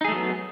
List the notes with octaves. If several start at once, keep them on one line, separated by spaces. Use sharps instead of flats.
F#3 A3 B3 D#4 G#4